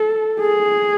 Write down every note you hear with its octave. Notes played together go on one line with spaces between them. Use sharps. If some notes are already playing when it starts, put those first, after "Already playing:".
Already playing: A4
G#4